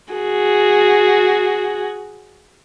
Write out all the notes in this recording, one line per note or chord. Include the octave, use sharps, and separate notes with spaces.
F#4 G#4